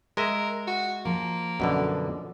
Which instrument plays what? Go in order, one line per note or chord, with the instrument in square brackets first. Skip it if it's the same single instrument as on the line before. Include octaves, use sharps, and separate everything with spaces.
[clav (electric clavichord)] G#3 D#5 E5 [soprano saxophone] A#4
[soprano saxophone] F#4
[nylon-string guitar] F3 [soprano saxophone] A#3
[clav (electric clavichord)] F#2 B2 D3